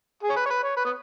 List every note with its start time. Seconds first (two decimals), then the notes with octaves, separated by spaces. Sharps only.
0.23 G#4
0.30 C#5
0.36 B4
0.46 C#5
0.50 B4
0.63 C#5
0.77 B4
0.85 B3